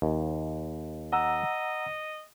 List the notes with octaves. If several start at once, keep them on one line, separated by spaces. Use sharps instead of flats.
D#2
D#5 F#5 A#5 E6